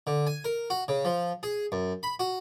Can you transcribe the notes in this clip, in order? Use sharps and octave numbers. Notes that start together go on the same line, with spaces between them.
D3
G#5
A#4
F#4
C#3
F3
G#4
F#2
B5
F#4